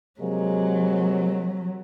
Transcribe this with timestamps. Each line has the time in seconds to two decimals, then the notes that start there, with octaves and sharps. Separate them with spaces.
0.20 C3 F#3 G#3 A#3